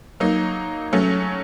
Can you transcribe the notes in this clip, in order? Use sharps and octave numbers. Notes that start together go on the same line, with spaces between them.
F#3 A#3 D#4
F#3 A3 C#4